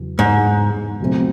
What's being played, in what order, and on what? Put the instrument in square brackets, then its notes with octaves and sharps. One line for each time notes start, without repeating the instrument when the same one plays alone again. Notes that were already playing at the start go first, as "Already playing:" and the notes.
Already playing: [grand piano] E2 C#3 F#3
[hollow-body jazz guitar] G#2
[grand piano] C#2 B2 F#3 A3 C4